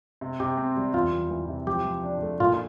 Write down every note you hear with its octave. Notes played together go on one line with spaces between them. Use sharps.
C3
C3 G4
C4
G3
E2 F4
E2
E3
C3
F3 G4
F3
D4
A3
A#2 F4